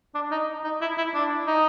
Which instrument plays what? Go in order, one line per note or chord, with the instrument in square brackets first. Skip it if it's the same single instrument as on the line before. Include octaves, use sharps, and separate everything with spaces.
[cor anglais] D4
D#4
D#4
E4
E4
D4
D#4